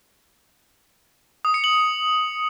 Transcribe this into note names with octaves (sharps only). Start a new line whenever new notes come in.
D#6
C#7
F#7